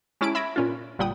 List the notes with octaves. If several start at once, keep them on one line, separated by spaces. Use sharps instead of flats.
G#3 C#4 E4 A5 B5 D7
E5 B5 G#6 A#6 B6 D7
A#2 C#4 F4
G1 A#2 G3 F#5 G5 D#6